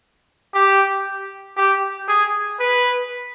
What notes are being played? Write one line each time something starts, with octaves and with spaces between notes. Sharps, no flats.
G4
G4
G#4
B4